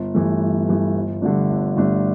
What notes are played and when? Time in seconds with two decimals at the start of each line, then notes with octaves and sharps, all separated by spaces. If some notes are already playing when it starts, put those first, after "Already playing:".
Already playing: G1
0.15 G2 E3 A3
0.41 G1
0.68 G2 E3 A3
0.95 G1
1.22 G2 D3 A3 D4
1.49 G1
1.76 G2 D3 A3 D4